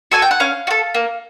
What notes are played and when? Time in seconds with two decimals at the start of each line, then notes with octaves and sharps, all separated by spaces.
0.12 F#4 A4 G#5
0.22 G5
0.31 F#5
0.40 C#4 F5
0.67 F#4
0.71 A4
0.94 A#3